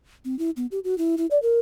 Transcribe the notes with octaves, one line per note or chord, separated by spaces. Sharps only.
C4
E4
B3
G4
F#4
E4
E4
D5
A#4